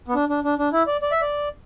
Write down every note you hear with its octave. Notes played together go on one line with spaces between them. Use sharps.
B3
D4
D4
D4
D4
E4
D5
D5
E5
D5